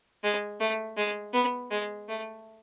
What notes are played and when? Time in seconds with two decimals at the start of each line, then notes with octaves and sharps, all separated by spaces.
0.24 G#3
0.60 A3
0.97 G#3
1.34 B3
1.71 G#3
2.08 A3